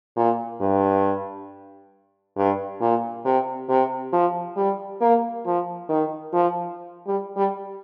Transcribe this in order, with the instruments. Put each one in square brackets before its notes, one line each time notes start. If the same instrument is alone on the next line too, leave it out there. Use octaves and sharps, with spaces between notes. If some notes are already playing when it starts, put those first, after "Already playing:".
[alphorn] A#2
G2
G2
A#2
C3
C3
F3
G3
A#3
F3
D#3
F3
G3
G3